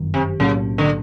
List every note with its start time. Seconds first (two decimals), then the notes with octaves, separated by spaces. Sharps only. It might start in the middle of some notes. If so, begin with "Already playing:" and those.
Already playing: G1 F#2 D#3
0.14 C3
0.40 B1 A2 C#3 F#3 A#3
0.78 D3